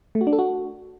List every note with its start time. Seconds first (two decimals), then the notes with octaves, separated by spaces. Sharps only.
0.15 A3
0.21 F#4
0.27 D4
0.33 A4
0.39 F#4